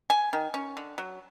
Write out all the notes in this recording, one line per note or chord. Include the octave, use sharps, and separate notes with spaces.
G#5
D#3
C#4
D3
F#3